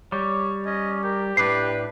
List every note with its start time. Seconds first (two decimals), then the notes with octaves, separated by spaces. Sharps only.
0.12 G3 C#5
0.65 C#4 D#5
1.04 G4 A#4
1.37 A2 D4 B4 C7